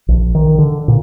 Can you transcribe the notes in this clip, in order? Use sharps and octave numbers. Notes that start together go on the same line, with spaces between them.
A#1
D#3
D3
A#2